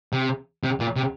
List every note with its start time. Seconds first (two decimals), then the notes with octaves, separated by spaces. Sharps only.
0.13 C3
0.64 C3
0.80 A#2
0.96 C3